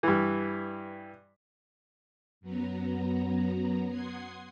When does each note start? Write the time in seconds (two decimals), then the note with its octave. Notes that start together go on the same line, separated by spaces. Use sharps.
0.03 G2 E3
2.41 F#2 F#3 B3 A#5
3.88 F#5 C6 D#6 G#6 C7